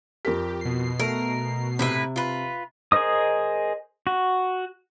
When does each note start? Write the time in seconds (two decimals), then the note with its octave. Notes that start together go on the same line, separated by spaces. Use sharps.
0.25 F2 G4 A#4 B6
0.61 B2 C7
1.00 A3 A#4
1.79 A2 C3 E4 B4
2.16 F4 B4
2.92 G#4 A#4 C5 D#5 D#6
4.07 F#4